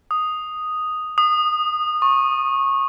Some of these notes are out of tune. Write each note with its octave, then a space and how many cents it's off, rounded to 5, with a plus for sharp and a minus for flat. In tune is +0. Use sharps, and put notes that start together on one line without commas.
D#6 +0
D#6 -25
C#6 -15